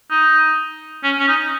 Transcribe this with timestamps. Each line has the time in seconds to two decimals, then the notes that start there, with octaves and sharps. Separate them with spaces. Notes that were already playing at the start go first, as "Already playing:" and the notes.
0.10 D#4
1.04 C#4
1.19 C#4
1.28 D#4